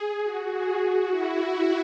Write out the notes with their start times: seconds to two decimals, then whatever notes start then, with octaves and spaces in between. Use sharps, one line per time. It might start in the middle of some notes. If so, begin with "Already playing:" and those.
Already playing: G#4
0.23 F#4
0.52 G#4
0.81 F#4
1.09 E4